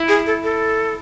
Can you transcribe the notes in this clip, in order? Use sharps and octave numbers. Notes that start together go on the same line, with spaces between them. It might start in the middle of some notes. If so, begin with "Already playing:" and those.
Already playing: E4
G#4
A4
A4